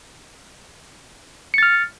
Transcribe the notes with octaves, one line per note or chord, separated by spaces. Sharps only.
F6 A6 C#7